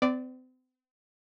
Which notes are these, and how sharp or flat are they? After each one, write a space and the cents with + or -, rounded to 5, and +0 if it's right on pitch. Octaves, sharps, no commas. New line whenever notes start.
C4 -40 D5 +0